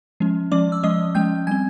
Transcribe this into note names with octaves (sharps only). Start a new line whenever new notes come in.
F3 G#3 C#4
F3 G#3 C#4 D5 D6
E6
F3 G#3 C#4 D#5 D#6
F3 G#3 C#4 G5 G6
G3 C4 G#5 G#6